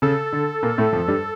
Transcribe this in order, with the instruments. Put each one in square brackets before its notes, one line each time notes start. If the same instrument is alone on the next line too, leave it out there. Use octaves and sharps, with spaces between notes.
[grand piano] C#3 [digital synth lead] A4
[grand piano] D3
A#2 A#3
A2 A3
F2 F3
G2 G3